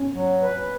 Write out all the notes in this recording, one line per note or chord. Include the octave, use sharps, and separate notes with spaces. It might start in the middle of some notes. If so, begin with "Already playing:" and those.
Already playing: C#4
F#3
B4